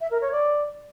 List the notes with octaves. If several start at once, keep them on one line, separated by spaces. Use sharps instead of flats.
E5
A#4
C#5
D5